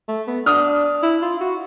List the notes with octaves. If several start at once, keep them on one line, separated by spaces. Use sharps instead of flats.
A3
B3
D4 D#6 F6
E4
F4
F#4